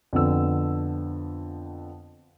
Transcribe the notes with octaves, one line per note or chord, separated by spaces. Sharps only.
F2 D3 B3 E6